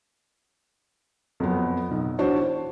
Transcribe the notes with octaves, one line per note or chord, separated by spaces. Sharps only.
F2 F#3 B3
B1
E3 D4 F#4 C5 C#5
C5